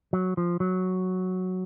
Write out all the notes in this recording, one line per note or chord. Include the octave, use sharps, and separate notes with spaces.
F#3
F3
F#3